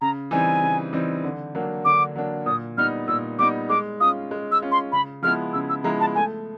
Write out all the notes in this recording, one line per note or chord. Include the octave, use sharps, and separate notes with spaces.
C#3 A#5
E3 G3 C4 D#4 G#5
C#3
E3 G3 C4 D#4
D3
F#3 A#3 D4
D3 D6
F#3 A#3 D4
A#2 D#6
G3 B3 D#4 F6
A#2 E6
G3 B3 D#4 D6
G#3 D6
C#4 F4 D#6
G#3
E6
C#4 F4
C6
C#3 B5
F3 G#3 B3 E4 F6
C#3 E6
E6
F3 G#3 B3 E4 A#5
A5
A3 G#5